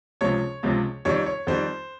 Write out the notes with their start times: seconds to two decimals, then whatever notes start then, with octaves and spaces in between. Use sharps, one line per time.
0.21 C#2 C3 F3 G#3 C#5
0.63 C#2 C3 F3 G#3
1.05 F2 D#3 G3 C#5
1.26 C#5
1.47 F2 D#3 G3 C5